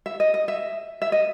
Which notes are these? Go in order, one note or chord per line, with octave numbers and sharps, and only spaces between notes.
E5
D#5
D#5
E5
E5
D#5